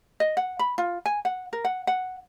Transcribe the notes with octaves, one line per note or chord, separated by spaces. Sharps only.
D#5
F#5
B5
F4
G#5
F#5
A#4
F#5
F#5